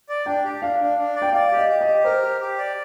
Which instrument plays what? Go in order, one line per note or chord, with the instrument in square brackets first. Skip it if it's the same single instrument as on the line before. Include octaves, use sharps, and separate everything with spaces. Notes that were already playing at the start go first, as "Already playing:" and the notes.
[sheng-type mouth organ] D5
[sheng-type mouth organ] D4 [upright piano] G5
[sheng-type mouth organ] G4
[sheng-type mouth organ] D4 [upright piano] F5
[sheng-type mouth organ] D4
D4
D5
[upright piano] G5
[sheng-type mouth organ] D5 [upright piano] F5
[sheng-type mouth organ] G4
[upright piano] D#5
[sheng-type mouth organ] G4
[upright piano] D#5
[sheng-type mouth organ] G4
[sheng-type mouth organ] A#4 [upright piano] C5
[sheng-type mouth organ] G4
G4
D5